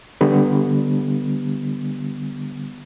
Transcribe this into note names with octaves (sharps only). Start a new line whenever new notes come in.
D3 G3 B3